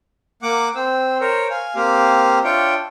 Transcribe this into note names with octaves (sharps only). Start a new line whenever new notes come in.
A#3 F#5 D6
C4 C5 E6
A#4 C5 C#5
F5 G#5
A#3 C4 G4 F5
D4 F4 C#5 E5 G5